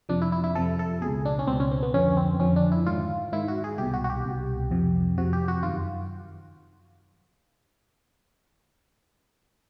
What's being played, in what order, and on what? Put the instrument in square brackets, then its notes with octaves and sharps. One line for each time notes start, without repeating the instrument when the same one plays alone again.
[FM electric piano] F2 C3 F3 D4
E4
E4
E4
F2 C3 F3 A4
A4
C#2 B2 G#4
D4
C#4
C#2 B2 C4
C#4
C4
B3
F2 D3 F3 C#4
C4
F2 D3 F3 C#4
D4
E4
G#2 D#3 F4
G#2 D#3 E4
F#4
G#4
C2 B2 G4
F#4
F#4
G4
C2 B2
F2 C3 F3
F2 C3 F3 F#4
G4
F#4
F#2 D#3 F4